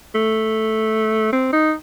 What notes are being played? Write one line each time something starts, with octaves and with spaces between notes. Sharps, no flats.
A3
C4
D#4